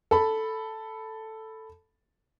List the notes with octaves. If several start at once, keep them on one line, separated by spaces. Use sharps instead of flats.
A4 B5